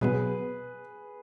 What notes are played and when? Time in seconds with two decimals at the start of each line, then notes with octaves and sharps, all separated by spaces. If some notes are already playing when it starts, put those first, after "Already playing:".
0.01 B2 F#3 B3 G#4 B4